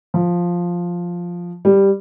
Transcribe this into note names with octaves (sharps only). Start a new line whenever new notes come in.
F3
G3